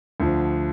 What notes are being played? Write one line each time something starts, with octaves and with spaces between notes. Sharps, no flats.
D2 D3 F3